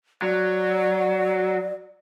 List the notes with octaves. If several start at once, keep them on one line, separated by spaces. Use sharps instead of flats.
F#3 D5